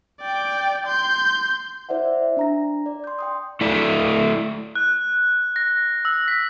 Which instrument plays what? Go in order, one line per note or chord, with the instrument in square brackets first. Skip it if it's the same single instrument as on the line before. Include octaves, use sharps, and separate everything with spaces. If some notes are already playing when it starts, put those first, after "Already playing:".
[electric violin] D5 G5
C6 G6
[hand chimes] E4 C5 D5 E5 F#5
E5
D4 A#5 A#6
D5
C6 G6
G5 C6 D#6
[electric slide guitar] A3 E4 A4 D5
[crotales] F#6
A#6
E6
B6